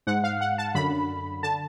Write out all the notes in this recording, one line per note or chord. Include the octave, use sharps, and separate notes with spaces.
G#2 F#5
F5
F#5
A5
F#2 D3 B5
D3 A5